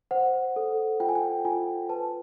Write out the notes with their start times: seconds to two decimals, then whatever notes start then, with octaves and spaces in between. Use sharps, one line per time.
0.11 C5 F#5
0.56 A4
1.00 F4 G5
1.09 G#5
1.15 G5
1.45 F4 G#5
1.89 B4 A5